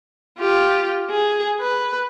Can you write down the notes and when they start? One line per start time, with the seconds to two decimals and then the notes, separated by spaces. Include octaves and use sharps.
0.39 F4 G4
1.10 G#4
1.61 B4